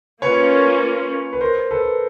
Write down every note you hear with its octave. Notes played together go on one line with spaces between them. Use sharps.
A#3 C#4 F4 B4 C#5
B4
A#4 C5
A4 B4